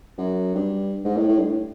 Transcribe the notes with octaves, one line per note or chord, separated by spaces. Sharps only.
F#2
G2
G#2
A2
A2
G2
A2